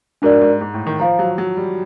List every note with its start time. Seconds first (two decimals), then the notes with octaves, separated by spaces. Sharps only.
0.22 G#2 D4 F#4 A#4 D5
0.41 G#2
0.61 G#2
0.74 A2
0.87 D#3
0.99 F3 C5 F5 A#5
1.19 F#3
1.38 F#3
1.57 G3